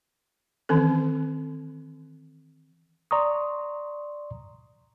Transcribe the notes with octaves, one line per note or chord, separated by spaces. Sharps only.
D#3 E3 C4 C#4 A4
D5 A#5 C6 C#6 D#6